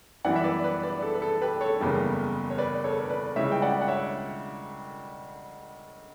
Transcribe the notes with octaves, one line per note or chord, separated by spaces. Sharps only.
F#2 E3 G3 B3 E4 D5 F#5
E5
B4 D5
B4 D5
B4 D5
A4
B4
A4
G4 B4
A4 C#5
F#1 E2 C#3 G3
C#5
B4 D5
A4 C#5
B4 D5
C#2 C#3 G3 C#4 E4 C#5 E5
G5
D5 F#5
F#5
C#5 E5